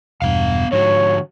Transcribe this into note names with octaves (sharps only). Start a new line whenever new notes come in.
E1 G2 B3 F5
G#2 D3 F3 F#4 C#5